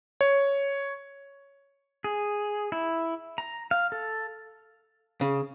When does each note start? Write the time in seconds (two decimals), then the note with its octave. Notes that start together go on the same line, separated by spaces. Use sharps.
0.21 C#5
2.04 G#4
2.72 E4
3.38 A#5
3.71 F5
3.92 A4
5.21 C#3